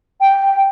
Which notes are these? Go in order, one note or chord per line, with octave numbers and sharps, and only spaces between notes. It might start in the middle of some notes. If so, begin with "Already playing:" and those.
G5